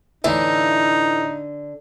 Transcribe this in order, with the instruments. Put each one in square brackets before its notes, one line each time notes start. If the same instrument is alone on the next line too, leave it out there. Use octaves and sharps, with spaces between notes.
[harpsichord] A2 E3 E4 [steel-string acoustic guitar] D3 [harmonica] D#4 [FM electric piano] E5